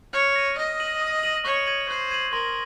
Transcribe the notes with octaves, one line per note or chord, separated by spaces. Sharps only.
C#5 F6
A#6 D#7
D#5 D#6
A#6 D#7 F#7
D#6
A#6 D#7 F#7
C#5 C#6
G#6 D#7 F#7
C5 C#6
G#6 D#7 F#7
A#4 C6